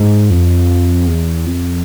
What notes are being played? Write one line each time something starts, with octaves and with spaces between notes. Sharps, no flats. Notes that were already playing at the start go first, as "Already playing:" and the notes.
Already playing: G#2
F2
E2
F2